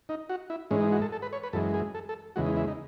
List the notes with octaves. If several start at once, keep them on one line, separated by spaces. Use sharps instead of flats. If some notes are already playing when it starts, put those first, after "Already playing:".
D#4
F#4
E4
G#2 E3 G#3 C#4
D#4
F#4
A4
A4
B4
C#5
B4
F#2 E3 G#3 A4
G#4
A4
A4
E2 C#3 E3 G#3 F#4
D#4
E4
D#4